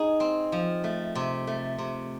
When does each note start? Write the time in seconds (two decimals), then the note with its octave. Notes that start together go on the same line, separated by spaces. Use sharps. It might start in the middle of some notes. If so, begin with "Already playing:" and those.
Already playing: D#4 G#4
0.20 C4
0.52 F3
0.84 A3
1.15 C3
1.47 A3
1.78 C3